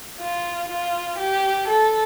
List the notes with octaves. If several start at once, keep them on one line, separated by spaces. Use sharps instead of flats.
F4
F4
G4
A4